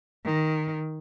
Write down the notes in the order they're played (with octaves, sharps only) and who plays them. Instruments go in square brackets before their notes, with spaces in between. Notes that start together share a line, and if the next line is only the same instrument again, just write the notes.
[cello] D#3